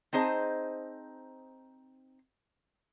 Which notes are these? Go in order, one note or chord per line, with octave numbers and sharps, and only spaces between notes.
C4 D#4 G#4 C5 D#5 A5